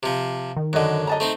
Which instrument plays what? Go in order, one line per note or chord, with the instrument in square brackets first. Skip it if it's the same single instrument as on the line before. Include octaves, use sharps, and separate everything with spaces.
[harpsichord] C3 F3
[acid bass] D#3
[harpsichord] F#2 D3 [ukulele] F#4 D#5
[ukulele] D#5 A5 A#5
[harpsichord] A3 C4 D#4